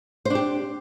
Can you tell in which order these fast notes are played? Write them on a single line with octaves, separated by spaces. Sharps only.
C5 D4 G4